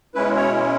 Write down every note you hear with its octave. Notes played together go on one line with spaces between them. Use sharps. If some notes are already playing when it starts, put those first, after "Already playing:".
B2 G#3 C#4 E4 B4
C#5